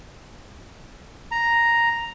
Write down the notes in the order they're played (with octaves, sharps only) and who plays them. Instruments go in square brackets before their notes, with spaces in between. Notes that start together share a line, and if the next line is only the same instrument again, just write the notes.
[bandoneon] A#5